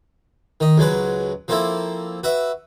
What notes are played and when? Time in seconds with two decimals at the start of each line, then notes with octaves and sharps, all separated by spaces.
0.60 D#3 D#5
0.78 C#2 F#3 G#3 B4
1.48 F3 A#3 C4 E4 A4
2.23 F#4 B4 E5